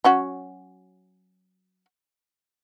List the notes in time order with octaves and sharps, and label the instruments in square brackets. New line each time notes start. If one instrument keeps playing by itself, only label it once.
[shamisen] F#3 C#4 F#4